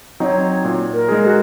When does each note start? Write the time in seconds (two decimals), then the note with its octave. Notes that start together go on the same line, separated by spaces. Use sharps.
0.20 F#3 C4 D#4 C#5 D#5
0.64 A#2
0.93 A#4
1.08 G#3 D#4 G#4
1.22 A#4
1.26 F#4